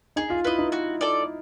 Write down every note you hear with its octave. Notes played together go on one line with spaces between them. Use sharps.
D#4 G#4
F4
E4 B4 D#5
D#4
F#4
A4 D5